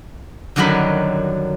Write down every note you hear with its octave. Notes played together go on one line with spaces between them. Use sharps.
F#2 D3 D#3 F#3 G3 B5